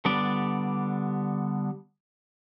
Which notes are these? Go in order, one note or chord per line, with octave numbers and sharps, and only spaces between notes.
D3 G3 B3 D4 D5